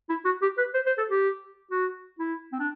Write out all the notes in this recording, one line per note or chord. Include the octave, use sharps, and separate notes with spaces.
E4
F#4
G4
B4
C5
C5
A4
G4
F#4
E4
C4
D4